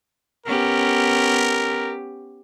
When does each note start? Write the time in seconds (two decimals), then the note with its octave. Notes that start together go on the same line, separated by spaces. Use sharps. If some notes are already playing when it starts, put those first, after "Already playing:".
0.46 B3 C#4 G4 A#4